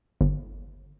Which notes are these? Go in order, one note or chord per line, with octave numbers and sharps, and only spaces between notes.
G1